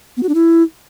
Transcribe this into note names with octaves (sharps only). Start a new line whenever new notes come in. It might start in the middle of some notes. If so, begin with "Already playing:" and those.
B3
F#4
D4
E4